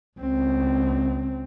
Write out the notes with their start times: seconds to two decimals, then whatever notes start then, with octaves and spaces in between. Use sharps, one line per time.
0.19 C#2 C4